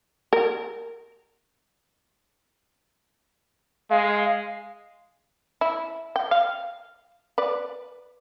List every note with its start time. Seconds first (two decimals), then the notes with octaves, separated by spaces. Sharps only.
0.33 A#4
3.90 G#3 F5
5.61 E4
6.16 G5
6.31 F5
7.38 B4 D5